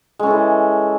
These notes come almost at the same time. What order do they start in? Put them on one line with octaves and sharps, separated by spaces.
G#3 C#4 A4 E3